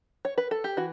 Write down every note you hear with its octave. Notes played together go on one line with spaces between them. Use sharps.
C#5
B4
A4
G4
E3 F#4